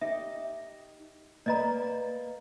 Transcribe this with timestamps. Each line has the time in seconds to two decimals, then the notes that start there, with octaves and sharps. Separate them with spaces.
0.01 D#4 G4 D#5 E5
1.46 A#3 B4 D5 D#5 A#5